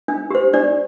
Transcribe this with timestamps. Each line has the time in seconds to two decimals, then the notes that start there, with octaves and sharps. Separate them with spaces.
0.08 D4
0.30 G4 C5
0.53 D4 D5